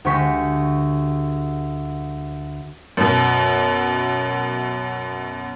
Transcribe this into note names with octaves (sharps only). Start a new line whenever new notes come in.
D2 G#3 G4 C#6 B6
F#2 B2